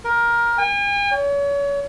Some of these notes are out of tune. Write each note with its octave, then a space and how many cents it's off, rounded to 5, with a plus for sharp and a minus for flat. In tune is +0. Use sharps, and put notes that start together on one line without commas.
A#4 +15
G#5 -45
C#5 +35